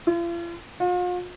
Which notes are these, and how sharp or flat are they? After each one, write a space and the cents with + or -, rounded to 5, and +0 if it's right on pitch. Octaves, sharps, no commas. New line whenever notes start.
F4 -45
F4 +40